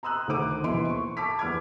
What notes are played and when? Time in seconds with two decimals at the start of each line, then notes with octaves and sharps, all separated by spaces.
0.03 A#5 C6 D#6 E6 F#6
0.28 D2 D#3 D#4 C5 D6 D#7
0.64 D#1 B1 E3 E4 C6 D7
0.90 C#6
1.17 A5 D6 B6
1.39 E2 D6 F6 G#6